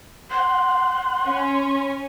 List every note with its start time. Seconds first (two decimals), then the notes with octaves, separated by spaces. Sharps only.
0.31 F#5 C6
1.27 C#4